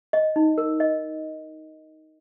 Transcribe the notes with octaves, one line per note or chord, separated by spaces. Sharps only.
D#5
D#4
A#4
D#5